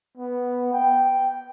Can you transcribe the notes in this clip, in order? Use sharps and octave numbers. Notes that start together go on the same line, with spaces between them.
B3
G5